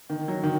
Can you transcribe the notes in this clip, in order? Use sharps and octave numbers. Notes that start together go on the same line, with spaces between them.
D#3
F#3
D#3